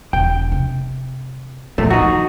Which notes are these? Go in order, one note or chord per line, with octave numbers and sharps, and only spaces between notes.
E1 G5
C3
E2 A#2 F3 A3
D#3 F3 D#4 F#4